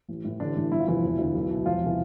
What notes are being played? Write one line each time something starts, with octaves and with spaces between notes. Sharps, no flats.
A1
A2 E3
A1 D3 D4
A2 E3
G1 E4
F4
F2 C3 E3 E4
E1
D2 D3
B1
B2
E1 F3 F4
C3 E3